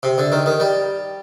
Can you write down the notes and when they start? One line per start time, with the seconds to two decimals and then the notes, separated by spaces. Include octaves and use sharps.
0.03 C3
0.18 D3
0.32 D#3
0.46 D#3
0.60 G3